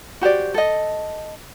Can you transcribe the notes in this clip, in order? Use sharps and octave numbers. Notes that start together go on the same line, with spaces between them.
F#4 G4 C5 D5
A4 D#5